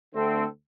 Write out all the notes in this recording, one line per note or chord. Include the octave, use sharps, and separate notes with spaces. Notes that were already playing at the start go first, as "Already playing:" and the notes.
D2 D3 A3 C4 A4